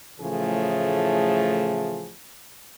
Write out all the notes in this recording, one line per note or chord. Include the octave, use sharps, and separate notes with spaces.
A2 C#3 E3 F3 A3 G#4